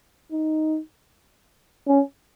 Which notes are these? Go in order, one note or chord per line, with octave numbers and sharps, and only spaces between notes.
D#4
C#4